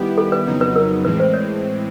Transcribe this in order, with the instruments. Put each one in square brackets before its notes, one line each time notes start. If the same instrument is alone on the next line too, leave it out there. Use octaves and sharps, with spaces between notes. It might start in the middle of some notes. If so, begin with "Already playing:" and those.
Already playing: [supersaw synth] D#3 G3 B3 E4 G4
[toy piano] A4
B4
[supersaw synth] F2 C#3 F#3 B3 D#4
[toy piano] B4
A#4
[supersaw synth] A2 E3 G#3 C4 [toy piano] B4
[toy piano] C5
C#5